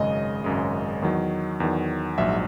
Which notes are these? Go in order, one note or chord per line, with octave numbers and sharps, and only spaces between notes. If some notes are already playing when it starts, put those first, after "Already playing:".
Already playing: G#1 F#2 C#3 G#3 D#5
G#1 F#2 C#3 G#3
E2 D#3 F#3
E2 D#3 F#3
A#1 G#2 F#3 E5